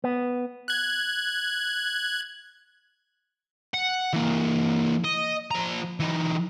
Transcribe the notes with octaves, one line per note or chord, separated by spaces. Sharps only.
B3
F#6 G#6
F#5
E3 A#3
D#5
F3 A#5
E3 D#4